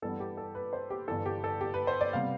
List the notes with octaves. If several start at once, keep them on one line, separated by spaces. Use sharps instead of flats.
G2 E3 G3 B3 A4
G4
A4
B4
C5
G4
G1 G2 E3 A4
G4
A4
G4
B4
C5
D5
C3 G3 B3 F5